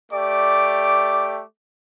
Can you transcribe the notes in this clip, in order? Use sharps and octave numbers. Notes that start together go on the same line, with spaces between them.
A3 G4 D5 D6